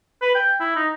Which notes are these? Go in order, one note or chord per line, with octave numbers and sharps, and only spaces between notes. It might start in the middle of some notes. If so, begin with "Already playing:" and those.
B4
G5
E4
D#4